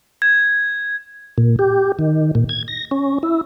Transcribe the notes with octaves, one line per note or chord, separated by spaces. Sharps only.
G#6
A#2
G4
D#3
A#2
G#6
A#6
C#4
E4